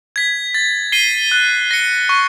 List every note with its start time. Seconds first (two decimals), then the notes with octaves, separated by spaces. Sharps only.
0.16 G#6 B6
0.54 A6
0.92 C7 D#7 G7
1.31 F#6
1.71 A#6 C#7
2.09 C#6